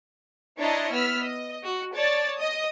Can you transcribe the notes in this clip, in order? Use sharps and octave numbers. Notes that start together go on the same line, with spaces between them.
D4 E4 C#5 D#5 A#5 C6
B3 E6 F6 B6
D#5
F#4
C#5 D5 A5 A6
D#5 D#6